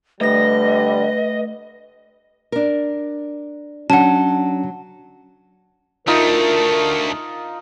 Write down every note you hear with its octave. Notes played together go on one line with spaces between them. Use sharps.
D3 G3 A3 B4 D#5 A#6
D4 A#4
F#3 C#4 D4 F#5 A5
D2 A3 D#4 F4 A#4